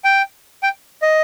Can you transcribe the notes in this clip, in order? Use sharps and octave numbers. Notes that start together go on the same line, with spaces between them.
G5
G5
D#5